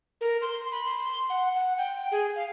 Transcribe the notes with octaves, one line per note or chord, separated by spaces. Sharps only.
A#4
C6
B5
C6
F#5
F#5
G5
G#4
F5